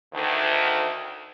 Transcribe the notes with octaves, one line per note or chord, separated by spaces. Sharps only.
D2 D#3